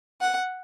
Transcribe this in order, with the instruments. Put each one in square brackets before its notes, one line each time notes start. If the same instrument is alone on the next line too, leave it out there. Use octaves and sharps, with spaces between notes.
[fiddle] F#5